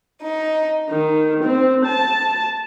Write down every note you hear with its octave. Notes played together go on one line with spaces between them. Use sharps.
D#4
D#3
C4
A5